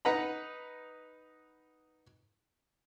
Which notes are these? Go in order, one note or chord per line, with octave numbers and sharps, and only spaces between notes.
D#4 B4 F#5 A#5 B5